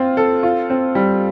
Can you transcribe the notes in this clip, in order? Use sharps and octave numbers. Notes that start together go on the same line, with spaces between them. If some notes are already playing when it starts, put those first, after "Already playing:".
Already playing: C4 F4
A4
F4
C4
G3